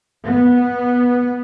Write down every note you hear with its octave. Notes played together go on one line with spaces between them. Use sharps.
B3